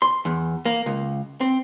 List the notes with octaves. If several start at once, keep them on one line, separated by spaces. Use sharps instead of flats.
C6
E2
A#3
C#2
C4